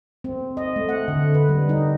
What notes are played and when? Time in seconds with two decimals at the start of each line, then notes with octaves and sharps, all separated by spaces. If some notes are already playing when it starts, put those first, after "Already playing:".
0.24 C4
0.57 D#5
0.76 A3
0.89 F#5
1.08 D3
1.34 B4
1.49 G3
1.69 D#4